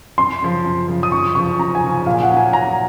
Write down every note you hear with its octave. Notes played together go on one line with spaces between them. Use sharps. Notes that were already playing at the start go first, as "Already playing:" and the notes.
F#2 C6
C#3 F3
F#2
C#3 F3
D#6
F#2 C#6
C#3 F3 C#6
F#2 A#5
G#5
C#3 F3
A#2 F5
F#5
F#3 C#4
G#5
A#2 A#5